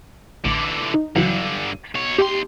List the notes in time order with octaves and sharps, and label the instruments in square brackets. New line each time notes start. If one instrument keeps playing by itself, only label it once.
[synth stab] A1 D6 [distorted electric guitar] D3 E3
[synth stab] D#4
[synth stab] C#2 E3 F#3 [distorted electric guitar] G2 D3
[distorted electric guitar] B2 C#5
[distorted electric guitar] D#2 C6 [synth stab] G4